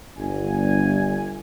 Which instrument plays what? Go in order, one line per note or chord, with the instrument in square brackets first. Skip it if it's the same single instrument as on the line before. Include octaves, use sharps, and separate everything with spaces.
[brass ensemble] G1 G#5